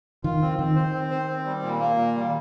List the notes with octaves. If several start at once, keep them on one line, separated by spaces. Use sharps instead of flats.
D#3 F4
C4
D#3 C4
C5
C4
C5
C4
G3
A#2
A#3
A#2
G3